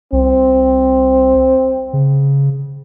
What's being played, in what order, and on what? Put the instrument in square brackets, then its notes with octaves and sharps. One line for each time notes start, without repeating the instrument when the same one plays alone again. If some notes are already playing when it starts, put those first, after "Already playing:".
[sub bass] C2 [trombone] C4
[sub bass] C#3